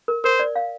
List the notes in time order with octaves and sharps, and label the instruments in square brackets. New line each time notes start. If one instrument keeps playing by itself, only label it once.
[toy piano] A#4
[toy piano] A#4 [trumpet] C5
[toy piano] D5
F5